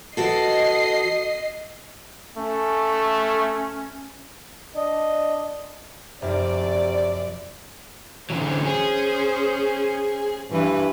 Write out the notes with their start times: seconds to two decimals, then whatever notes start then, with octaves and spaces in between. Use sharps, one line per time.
0.17 E3 F#4 A4 D#5 C7
2.37 A3 C#4
4.76 D4 D#5
6.22 F1 F#2 C3 D5
8.30 D3 E3 F#3 C#4 C5
8.65 G#4
10.51 G2 E3 B4